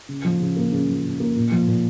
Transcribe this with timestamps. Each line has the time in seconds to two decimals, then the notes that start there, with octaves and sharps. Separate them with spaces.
0.09 C#3
0.25 F3
0.40 C#3
0.57 A#3
0.72 C#3
0.88 F3
1.04 C#3
1.20 A#3
1.36 A#2
1.52 F3
1.68 A#2